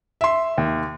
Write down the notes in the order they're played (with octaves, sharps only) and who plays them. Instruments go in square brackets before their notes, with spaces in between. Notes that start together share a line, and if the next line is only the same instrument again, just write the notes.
[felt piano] E5 C6
[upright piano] D#2